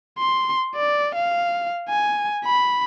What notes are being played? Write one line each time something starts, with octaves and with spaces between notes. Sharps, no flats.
C6
D5
F5
G#5
B5